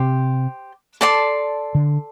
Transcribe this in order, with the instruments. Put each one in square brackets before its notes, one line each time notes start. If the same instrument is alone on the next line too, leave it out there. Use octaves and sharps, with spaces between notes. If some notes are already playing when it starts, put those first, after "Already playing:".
Already playing: [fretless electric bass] C3 [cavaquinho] G4 C5
[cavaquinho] A4 D5 A5 C6
[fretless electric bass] D3